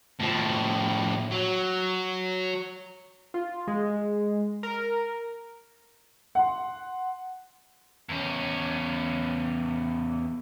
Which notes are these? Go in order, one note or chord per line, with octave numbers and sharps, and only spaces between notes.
A2 F3
F#3
F4
G#3
A#4
F#5 C6
E2 C#4